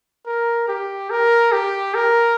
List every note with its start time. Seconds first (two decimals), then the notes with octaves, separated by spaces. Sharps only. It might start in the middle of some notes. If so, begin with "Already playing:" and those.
0.27 A#4
0.68 G4
1.11 A#4
1.52 G4
1.95 A#4